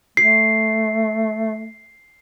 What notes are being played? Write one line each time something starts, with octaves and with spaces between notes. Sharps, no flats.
A3 C7